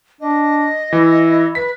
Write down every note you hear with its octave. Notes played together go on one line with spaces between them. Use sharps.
D4 D#5
E3 E4
B4 B6